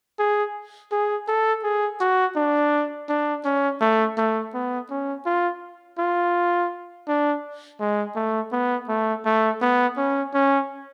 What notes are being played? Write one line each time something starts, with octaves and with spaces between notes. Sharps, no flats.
G#4
G#4
A4
G#4
F#4
D4
D4
C#4
A3
A3
B3
C#4
F4
F4
D4
G#3
A3
B3
A3
A3
B3
C#4
C#4